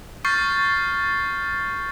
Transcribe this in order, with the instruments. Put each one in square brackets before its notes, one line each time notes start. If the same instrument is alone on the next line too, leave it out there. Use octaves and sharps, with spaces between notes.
[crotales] C#6 F6 G6 A6 C7